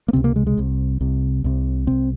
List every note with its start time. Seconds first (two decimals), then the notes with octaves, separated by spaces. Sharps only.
0.08 A#3
0.13 C#2 C3 C4
0.24 A#3
0.36 G#3
0.47 G#3
0.57 C2 C3
1.01 C2 C3
1.44 C2 C3
1.87 C2 C3 C4